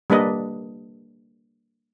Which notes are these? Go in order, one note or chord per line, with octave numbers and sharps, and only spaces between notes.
G3 A#3 D4 B4 D#5